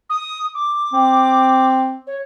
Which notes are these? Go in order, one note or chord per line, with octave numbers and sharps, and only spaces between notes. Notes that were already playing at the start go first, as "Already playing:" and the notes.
D#6
D6
C4
C#5